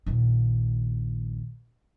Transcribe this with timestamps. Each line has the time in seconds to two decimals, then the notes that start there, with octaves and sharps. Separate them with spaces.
0.06 A#1 D#2